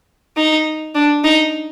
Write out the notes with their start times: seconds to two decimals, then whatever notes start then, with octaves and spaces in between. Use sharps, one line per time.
0.37 D#4
0.95 D4
1.24 D#4